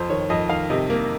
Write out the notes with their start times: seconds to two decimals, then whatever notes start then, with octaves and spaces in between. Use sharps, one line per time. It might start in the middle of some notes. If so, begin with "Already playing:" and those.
Already playing: F2 C5
0.10 D#3 C#5
0.30 F2 D#5
0.49 D#3 F5
0.70 C3 D#5
0.90 A#3